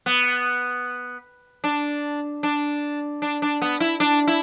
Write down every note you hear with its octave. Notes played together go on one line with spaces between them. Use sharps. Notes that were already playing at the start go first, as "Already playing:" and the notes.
B3
D4
D4
D4
D4
B3
E4
D4
E4